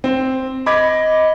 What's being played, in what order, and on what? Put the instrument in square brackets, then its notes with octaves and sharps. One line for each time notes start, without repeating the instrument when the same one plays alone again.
[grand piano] C4
[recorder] D#5 [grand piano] B5 D6 G#6